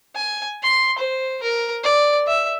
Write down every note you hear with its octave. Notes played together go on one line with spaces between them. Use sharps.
G#5
C6
C5
A#4
D5
E5